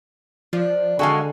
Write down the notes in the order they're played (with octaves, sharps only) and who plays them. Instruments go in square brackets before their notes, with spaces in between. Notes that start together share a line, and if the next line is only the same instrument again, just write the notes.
[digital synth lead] F3 [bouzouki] D4
[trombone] D3 [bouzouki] D#3 G#3 [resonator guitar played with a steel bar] F#4 A4 F5 [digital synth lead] G#5